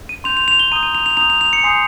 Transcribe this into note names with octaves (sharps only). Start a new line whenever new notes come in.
D#7
C6 G6 F7
F7
F7
G7
A#5 D#6 G6 D#7
D#7
F7
F7
A#5 D#6 G6 F7
F7
F7
C#7
G#5 C6 D#6 G6 C7